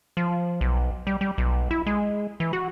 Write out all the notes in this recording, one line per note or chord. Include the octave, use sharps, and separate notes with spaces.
F3
B1
G3
G3
B1
E4
G#3
E3
F#4